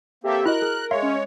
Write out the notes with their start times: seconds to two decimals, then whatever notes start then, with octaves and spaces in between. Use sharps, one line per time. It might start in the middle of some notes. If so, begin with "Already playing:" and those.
0.24 A#3 C4 G4 A4 E5
0.46 E4 F#4 A#4 D#5 F#6
0.62 G#4
0.91 G#3 C#5 E5 F5 C6
1.02 C#4